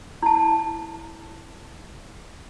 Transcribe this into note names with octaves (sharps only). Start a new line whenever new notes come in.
E4 A5